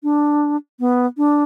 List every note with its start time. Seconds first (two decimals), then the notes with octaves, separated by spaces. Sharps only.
0.03 D4
0.80 B3
1.17 D4